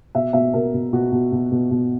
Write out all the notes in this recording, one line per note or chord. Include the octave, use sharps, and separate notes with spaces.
B2 E5
B2 E5
B2 A#4
B2
B2 F#4
B2
B2
B2
B2